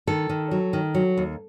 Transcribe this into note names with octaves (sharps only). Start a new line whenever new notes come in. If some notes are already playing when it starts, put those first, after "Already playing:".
D#3 A4
D#3
F#3
D#3
F#3
D#2